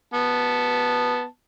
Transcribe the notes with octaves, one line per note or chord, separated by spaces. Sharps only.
B3 A5